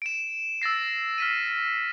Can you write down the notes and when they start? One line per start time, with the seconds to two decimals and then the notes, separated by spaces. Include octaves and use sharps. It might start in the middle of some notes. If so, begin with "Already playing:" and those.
0.02 D7 E7
0.62 E6 A6 A#6 C7
1.18 F6 B6 D#7